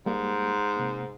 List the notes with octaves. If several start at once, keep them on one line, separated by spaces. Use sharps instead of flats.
G#2 G3 A#3 G4
C3 A#3